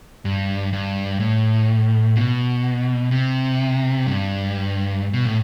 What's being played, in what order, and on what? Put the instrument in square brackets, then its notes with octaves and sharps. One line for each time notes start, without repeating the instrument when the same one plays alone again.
[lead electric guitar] G2
G2
A2
B2
C3
G2
B2
A2